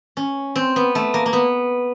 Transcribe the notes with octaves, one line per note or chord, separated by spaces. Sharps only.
C#4
C4
B3
A3
A#3
A#3
B3